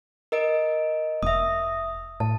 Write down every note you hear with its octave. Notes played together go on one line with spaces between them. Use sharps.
A#4 D#5 D7
F1 E5 D#6
A2 A5